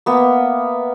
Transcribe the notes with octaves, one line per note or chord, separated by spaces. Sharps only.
A#3 B3 E5